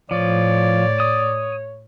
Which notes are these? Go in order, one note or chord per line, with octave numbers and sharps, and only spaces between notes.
A2 F3 C#5 D5
D#6